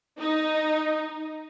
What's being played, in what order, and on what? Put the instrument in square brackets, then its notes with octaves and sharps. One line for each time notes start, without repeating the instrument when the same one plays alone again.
[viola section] D#4